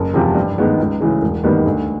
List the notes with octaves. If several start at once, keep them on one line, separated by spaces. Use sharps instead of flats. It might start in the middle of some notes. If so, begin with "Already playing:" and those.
Already playing: F#1
E2 C3 F3
G2
D#3 G#3 B3
C#2
C#3 E3 G#3
E1
D#2 D#3 G3 B3
D2